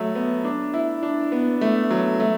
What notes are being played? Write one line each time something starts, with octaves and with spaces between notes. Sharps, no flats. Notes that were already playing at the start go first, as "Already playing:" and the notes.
Already playing: F#3 A3
B3
D4
E4
D4
B3
A3
F#3
A3